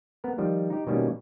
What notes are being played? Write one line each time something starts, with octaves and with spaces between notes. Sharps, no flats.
B3 A#4
D#3 F3 G3
D#4 G4
B2 D#3 G3 A#3 C#4